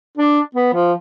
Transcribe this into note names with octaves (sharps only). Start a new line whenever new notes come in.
D4
B3
F3